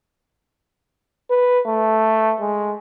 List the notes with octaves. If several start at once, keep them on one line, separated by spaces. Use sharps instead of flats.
B4
A3
G#3